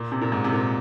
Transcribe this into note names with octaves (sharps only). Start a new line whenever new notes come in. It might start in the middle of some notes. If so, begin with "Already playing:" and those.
Already playing: A#2
C3
A#2
G#2
C3
A#2